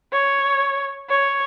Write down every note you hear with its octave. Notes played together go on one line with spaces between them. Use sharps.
C#5
C#5